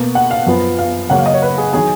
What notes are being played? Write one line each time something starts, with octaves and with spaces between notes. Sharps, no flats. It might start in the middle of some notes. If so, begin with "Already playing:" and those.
Already playing: B2 A#3
F#5
F5
F#2 F3 B3
F5
C#3 F#3 A#3 F#5
F5
D#5
C#5
B4
G#4
D#3 F#3 G#4